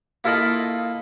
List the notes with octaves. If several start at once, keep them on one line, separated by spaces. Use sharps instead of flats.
A#3 E4 F4 A4 D#5 B5